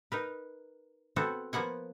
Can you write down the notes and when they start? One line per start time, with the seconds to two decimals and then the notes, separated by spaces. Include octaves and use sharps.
0.12 D#4 A#4 B4
1.16 B3 C4 F#4 A4
1.53 F3 A#3 B3 F#5 G#5